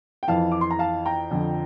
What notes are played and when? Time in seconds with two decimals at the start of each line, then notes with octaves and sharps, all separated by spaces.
0.23 G5
0.28 F2 E3 F5 A5
0.52 D6
0.61 C6
0.71 A#5
0.79 F5 A5
1.06 G5 A#5
1.31 F2 D3 F3